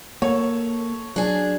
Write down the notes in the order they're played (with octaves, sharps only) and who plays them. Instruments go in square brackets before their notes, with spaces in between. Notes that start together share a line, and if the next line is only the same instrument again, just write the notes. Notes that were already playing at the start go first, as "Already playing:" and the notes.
[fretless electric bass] A#3 [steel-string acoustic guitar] A4 [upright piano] C#5
[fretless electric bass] F#3 [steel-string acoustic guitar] D4 G#4